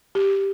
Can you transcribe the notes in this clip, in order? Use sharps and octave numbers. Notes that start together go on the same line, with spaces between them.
G4